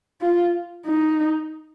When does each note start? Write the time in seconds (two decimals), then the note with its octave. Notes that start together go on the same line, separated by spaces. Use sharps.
0.21 F4
0.86 D#4